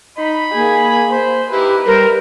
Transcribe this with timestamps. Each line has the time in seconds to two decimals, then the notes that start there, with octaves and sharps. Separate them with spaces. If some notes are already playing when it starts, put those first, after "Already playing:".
0.18 D#4 B5
0.54 A#3 G#4
1.11 C5
1.52 A#3 D#4 E4 G4 B4
1.86 G3 A#4 C5